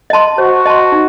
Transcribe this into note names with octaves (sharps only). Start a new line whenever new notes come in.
D#5 A5 C6
F#4 C5
D#5 A5 C6
D#4